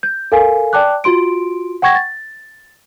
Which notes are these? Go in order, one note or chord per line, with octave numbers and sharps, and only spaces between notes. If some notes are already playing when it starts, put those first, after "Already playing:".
G6
A4 A#4 F5 G#5
D5 G5 A5 D6 F#6
F4 F#4 C6 D7
F#5 G5 C#6 G#6 A#6
A6